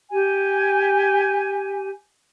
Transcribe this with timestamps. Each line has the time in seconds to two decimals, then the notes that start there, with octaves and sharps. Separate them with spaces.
0.10 G4 G#5